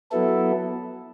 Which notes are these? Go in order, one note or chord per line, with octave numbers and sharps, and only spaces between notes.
F#3 B3 E4 A4